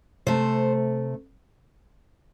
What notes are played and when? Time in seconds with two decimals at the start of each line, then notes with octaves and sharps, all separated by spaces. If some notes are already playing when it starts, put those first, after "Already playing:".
0.26 C3 A3 C5